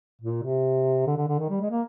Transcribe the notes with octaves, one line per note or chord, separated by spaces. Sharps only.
A#2
C3
D3
D3
D3
D#3
G3
G#3
A#3